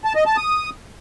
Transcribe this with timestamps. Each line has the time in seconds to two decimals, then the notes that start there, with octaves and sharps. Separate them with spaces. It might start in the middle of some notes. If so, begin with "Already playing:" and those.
0.04 A5
0.15 D#5
0.26 A5
0.37 D#6